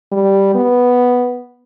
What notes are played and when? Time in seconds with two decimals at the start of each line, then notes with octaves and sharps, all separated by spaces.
0.12 G3
0.55 B3